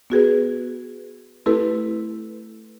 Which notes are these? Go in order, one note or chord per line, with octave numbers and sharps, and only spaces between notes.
B3 F#4 G#4 B4
A3 C4 E4 G4 A4 B4